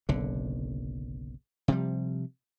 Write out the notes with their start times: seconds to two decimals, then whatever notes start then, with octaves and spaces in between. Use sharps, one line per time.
0.09 F#1 B1 D3
1.68 C3 F3 G3